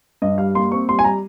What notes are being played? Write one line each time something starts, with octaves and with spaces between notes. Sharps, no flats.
G2 D#5
G3 F5
A#3 C6
C4 C#6
G3 C6
G#5
G3 A#5